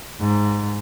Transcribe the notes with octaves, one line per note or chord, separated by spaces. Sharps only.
G#2